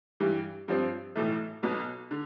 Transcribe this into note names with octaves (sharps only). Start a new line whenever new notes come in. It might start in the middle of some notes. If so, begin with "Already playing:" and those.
G2 E3 G3
G2 F3 C4
B1 A2 E3 A3
B1 B2 B3
D3